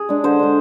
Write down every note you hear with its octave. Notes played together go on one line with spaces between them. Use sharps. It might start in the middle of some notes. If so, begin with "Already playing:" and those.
Already playing: G#4
G#3 D4
D3 C5
G#3 D4